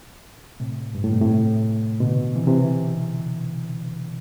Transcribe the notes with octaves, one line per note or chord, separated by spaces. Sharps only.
A2 C3
G2
A2
B2
A2 C3
B2 D3
C3 E3
C3 E3